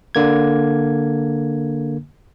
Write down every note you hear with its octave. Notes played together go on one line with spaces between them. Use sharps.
D3 A#3 G#6